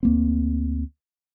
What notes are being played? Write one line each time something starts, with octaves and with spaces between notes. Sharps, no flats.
D2 A#3 C4